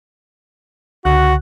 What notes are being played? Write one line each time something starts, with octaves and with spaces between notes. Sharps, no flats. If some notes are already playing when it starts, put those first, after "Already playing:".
C#2 D3 F#4 F#6